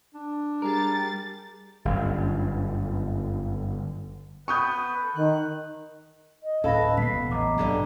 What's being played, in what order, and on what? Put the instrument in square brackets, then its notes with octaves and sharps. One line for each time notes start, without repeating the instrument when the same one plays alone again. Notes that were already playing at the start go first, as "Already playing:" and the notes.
[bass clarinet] D4
[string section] G3 A6 [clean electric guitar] G#4 A#4
[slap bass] G1 F#2
[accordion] B3 B4 [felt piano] C#6 D#6 G6
[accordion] A4
[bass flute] D#3 [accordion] F#6
[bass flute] D#5
[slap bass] D1 C#4 [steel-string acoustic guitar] A4 B4 [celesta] F5 B5 A#6
[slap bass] A#2 G3 B3 [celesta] B6 C7
[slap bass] E1 [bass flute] B3
[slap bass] A1 [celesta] D#5 A#5 D6
[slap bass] B1 [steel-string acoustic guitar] G2 D3 G3